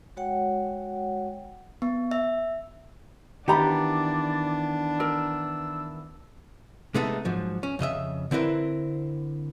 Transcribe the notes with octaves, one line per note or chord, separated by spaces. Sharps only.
G#3 F#4 C#5 F#5 G5
B3
E5
D#3 E3 B3 D4 G4 D5 A#5 B5
A#4 E6
C3 G#3 A3 B3 D#4 A4
G#2 F3 F#3
C#4
F2 C#3 D#5 E5
D3 C4 E4 A#4 B4